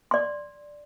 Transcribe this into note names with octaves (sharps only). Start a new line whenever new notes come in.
D5 C6